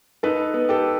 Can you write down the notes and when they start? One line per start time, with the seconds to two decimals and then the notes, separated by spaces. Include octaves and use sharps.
0.23 D#4 A4 B4
0.54 B3
0.69 G4 A4